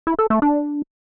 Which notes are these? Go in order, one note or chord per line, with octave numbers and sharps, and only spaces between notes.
E4
A4
A3
D4